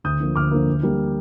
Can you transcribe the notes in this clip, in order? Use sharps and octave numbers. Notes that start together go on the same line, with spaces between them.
D2 D#6 G6
D3 F3 A#3
D2 D6 F6
D3 F3 A#3
D2
D3 G3 A#3